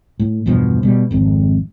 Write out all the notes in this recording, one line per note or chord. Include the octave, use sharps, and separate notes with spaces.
A2
E2 G2 B2 F3
B2 G3
G#1 F2